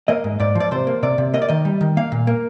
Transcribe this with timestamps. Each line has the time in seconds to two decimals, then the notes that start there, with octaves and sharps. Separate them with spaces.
0.08 A#3 D#5
0.24 G#2
0.40 G#2 D5
0.55 F3 D5
0.71 C3 C5
0.87 A#3
1.03 C3 D5
1.18 C3
1.34 A#3 D#5
1.42 D5
1.49 D#3 D#5
1.65 G3
1.81 D#3
1.97 A#3 F5
2.12 A#2
2.27 A#3